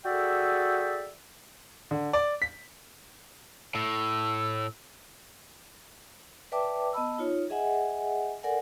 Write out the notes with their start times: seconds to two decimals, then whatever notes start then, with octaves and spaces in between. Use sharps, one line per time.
0.05 F#4 G#4 A4 D5 E5 G5
1.91 D3
2.13 D5
2.42 B6
3.75 A2 E6
6.52 B4 D5 E5 G5 A5 D6
6.93 B3 D#5 A5 B5 E6
7.18 D#4 F4 C#5
7.50 G#4 D#5 E5 F#5 G#5
8.43 A4 A#4 D5 F#5 G#5